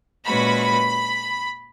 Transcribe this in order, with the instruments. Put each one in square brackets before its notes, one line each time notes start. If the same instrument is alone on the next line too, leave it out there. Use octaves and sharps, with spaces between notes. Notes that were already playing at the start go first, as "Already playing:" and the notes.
[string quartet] A#2 G#3 C#4 F#4 B4 [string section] B5